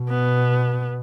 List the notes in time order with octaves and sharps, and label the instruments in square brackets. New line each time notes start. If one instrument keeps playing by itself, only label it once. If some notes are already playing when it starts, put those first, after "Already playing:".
Already playing: [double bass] B2
[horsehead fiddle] B3